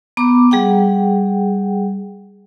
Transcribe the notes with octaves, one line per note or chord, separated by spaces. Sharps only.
B3 A#5 D6
G3 G#4 F#5 G5